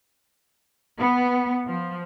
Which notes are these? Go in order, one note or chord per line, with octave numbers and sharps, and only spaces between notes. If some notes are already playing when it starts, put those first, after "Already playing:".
B3
F3